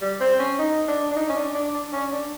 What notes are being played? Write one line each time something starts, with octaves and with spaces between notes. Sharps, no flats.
G3
C4
C#4
D#4
D4
D4
D#4
C#4
D4
D4
D4
C#4
D4